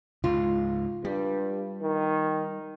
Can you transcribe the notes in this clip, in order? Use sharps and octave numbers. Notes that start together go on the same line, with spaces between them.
C#2 G#2 F4
G2 G3
D#3